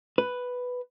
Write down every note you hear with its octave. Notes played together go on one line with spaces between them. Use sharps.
B4